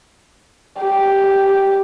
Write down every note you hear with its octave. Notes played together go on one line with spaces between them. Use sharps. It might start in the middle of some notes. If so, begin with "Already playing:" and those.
G4